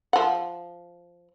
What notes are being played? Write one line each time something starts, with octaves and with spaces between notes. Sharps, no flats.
F3 F#5